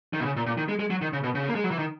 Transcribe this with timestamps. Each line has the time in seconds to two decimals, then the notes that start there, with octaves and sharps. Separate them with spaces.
0.13 D#3
0.20 B2
0.25 C#3
0.36 A#2
0.46 A#2
0.58 D#3
0.69 G#3
0.79 G#3
0.90 F#3
1.02 D#3
1.13 C#3
1.24 B2
1.35 C#3
1.48 A#3
1.55 G#3
1.64 F#3
1.71 E3
1.79 D#3